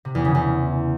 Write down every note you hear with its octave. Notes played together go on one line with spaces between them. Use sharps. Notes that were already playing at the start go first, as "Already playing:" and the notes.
C3
E2
C#3
E2